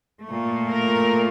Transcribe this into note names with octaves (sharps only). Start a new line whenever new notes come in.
A#2 A3
A#4